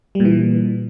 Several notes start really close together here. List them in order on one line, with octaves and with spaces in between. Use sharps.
G3 A#2 E3